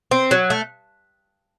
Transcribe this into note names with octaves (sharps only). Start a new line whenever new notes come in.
C4
F#3
A3